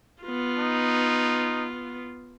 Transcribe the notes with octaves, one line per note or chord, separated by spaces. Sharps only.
B3 F4
D#4